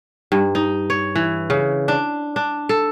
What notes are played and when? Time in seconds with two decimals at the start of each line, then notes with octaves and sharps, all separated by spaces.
0.32 G2
0.55 D#4
0.90 C#5
1.16 E3
1.50 C#3
1.88 D4
2.36 D4
2.69 A4